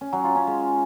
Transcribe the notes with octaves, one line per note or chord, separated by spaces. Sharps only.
C#4
F#3
F4
C#4
G#3